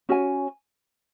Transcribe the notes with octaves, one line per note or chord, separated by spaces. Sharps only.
C#4 F#4 C#5 G#5